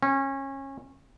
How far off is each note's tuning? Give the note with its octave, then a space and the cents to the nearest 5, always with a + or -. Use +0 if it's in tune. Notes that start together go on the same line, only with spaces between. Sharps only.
C#4 -25